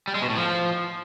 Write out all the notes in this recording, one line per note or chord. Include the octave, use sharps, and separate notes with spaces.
G3
G#3
B2
A2
F3